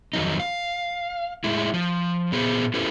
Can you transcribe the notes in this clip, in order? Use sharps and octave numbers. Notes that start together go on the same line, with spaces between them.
F2 D#3 F#3 D#4
F5
A2 G#3 E4
F3
A#2 B3 G#4 C5
C#4 E4 G4 A4 B4 C5